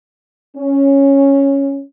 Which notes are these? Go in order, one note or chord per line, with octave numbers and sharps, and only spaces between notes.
C#4